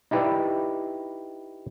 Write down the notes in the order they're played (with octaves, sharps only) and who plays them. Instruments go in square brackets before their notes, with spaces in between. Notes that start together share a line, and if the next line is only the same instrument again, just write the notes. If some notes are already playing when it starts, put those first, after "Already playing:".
[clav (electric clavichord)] D#4 E4 G4 B4 D5 E5